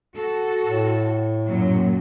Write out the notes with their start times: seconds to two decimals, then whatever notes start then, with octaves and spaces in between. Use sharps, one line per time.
0.15 F#4 A4
0.66 A2
1.48 F#2 A#2 F#3